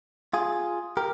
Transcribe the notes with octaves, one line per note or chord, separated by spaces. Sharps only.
F4 G#4
G4 A#4